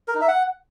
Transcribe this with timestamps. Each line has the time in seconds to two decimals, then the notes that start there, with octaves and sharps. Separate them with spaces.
0.08 A#4
0.15 D#4
0.21 E5
0.28 F#5